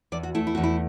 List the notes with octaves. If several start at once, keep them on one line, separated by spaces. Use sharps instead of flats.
E2 D5
F#4
A3 E4
E4
E2 F#4
E4